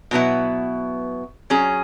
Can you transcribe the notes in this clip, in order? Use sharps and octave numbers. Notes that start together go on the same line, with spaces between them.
B2 F#3 B3 E4
F#3 C#4 G#4